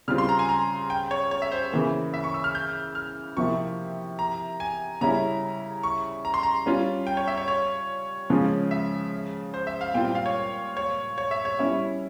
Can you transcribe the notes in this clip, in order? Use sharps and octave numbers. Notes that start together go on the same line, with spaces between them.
C#3 G3 C4 F4 F6
C6
A#5
G#5
A#5
G5
C#5
C#5
E5
C5
C#3 E3 A#3
E5
C#6
E6
F6
G6
F6
C3 F3 A#3 E4 C#6
A#5
G#5
C#3 G3 C#4 E4 A#5
C#6
A#5
C6
A#5
G3 C#4 F4
G5
C#5
E5
C#5
C#5
C#3 F3 G#3 C#4 F4
E5
C5
E5
F5
A#2 G3 C4 F4 G5
G5
F5
C#5
C#5
C#5
E5
C#5
G3 C#4 E4